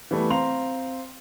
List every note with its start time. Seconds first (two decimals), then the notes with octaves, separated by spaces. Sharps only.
0.11 E3 G3 A3 B3
0.30 C4 F5 A#5 C6 F7